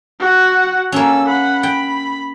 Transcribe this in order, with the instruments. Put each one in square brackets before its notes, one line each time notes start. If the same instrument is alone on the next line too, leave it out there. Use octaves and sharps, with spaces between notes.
[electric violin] F#4 F#5
[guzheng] A#3 C#4 [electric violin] A4 E6
[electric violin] F#5 B5
[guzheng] G5 [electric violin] B5